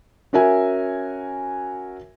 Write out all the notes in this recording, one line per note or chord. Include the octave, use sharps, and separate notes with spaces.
C#4 F#4 A#4 E5 G#5